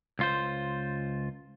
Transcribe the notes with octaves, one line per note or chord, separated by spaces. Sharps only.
C#2 F4 C5